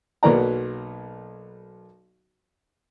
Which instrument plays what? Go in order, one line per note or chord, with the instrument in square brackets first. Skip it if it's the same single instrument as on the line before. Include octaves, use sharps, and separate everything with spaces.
[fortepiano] B1 F#3 A#3 B3 D5 A#5